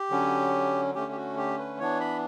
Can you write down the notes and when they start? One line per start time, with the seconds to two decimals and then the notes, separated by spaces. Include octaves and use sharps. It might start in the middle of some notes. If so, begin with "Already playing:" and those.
Already playing: G4
0.10 D3 F#3 C#4
0.95 D3 A3 C#4 G4
1.12 G4
1.16 F#4
1.37 G4
1.59 B4
1.79 E3 B3 D4 C#5
2.00 B5